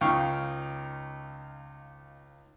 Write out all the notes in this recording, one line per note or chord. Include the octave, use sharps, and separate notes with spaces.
C#2 D#4 F5 G5 C#6 F6